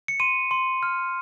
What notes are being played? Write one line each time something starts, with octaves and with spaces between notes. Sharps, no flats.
C#7
C6 D#7
C6
F6